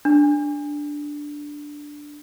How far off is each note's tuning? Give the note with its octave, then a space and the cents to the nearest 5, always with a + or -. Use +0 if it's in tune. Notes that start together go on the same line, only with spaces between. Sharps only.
D4 +0